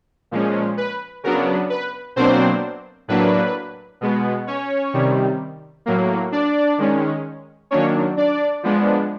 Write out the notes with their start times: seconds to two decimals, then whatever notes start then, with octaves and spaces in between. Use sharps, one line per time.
0.31 A#2 F3 G#3 C#4
0.77 B4
1.23 C#3 F#3 B3 D4 A#4
1.70 B4
2.16 B2 F#3 A#3 C4 D4 C5
3.08 A2 F#3 A#3 D4 B4
4.01 B2 G#3 B3
4.47 C#4 C#5
4.94 C3 D#3 G3
5.86 A2 F#3 A#3
6.32 D4 D5
6.78 D#3 G#3 C#4
7.71 D#3 F#3 A#3 C#4 D4 C#5
8.17 D4 D5
8.63 F3 G#3 B3 D4